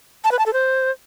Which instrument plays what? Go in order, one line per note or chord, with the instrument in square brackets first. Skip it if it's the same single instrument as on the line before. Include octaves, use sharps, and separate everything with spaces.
[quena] A5
B4
A5
A4
C5